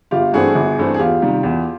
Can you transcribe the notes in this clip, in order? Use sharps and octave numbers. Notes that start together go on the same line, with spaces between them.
G1 F4 G4
G2 E3 A3 C4 F#4 G#4
G1
G2 E3 A3 C4
G#4
E2 F4 G4
C3 D#3 G3
E2